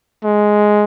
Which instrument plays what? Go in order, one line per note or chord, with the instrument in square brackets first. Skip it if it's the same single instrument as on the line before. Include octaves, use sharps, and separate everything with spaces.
[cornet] G#3